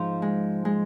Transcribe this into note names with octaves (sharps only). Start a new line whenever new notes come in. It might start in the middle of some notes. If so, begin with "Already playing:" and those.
Already playing: G#2 F3
G#3
G#3